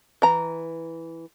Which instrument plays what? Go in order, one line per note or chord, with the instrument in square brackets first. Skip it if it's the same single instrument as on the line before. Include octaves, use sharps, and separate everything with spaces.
[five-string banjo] E3 A#5